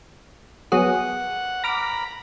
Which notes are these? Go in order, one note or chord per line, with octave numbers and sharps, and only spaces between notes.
F#3 B3 G#4 F#5
A#5 B5 D6 F6 A#6